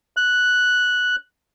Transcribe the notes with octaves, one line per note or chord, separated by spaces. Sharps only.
F#6